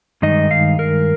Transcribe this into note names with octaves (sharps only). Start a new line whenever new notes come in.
G2 D#3 G#3 D#4 D#5
F5
A#4